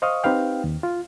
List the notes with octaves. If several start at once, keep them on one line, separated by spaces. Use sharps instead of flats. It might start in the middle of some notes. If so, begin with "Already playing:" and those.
C5 D#5 F5 C#6 D#6
C4 D#4 G4 B4 F5 G5
D#2
F4